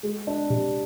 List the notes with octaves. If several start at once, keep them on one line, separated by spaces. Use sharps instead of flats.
G#3
D4
C3